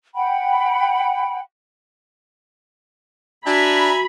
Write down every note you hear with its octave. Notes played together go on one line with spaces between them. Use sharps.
F#5 G5 B5
D4 F#4 E5 G#5 A#5 B5